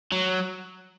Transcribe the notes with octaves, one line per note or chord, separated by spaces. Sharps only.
F#3